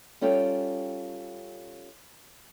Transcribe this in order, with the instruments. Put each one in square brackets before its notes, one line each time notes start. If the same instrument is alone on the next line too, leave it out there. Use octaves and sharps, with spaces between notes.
[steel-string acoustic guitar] G3 C#4 F4 A4 G5